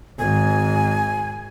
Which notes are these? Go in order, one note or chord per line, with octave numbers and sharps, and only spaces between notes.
G#1 G#5